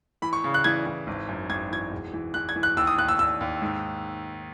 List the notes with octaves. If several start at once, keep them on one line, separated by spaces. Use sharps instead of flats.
E3 B5
C#6
C#3
F#6
E3 G#6
E3
G#1
F#2
G#1 G#6
E3 G#6
E1
E3
E3 F#6
G#6
E3
F#6
D#2 E6
D#6
D#2 F#6
E6
D#2 E6
D#2
G#2